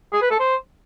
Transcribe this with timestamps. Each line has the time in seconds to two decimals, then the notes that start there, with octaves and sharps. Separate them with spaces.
0.13 G#4
0.22 B4
0.31 A4
0.40 C5